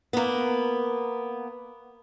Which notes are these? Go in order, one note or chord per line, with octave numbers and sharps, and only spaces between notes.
A#3 B3